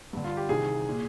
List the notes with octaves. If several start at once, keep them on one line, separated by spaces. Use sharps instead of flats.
G2 D3
F4
G4
C2 C3 D#3 G#4
A#2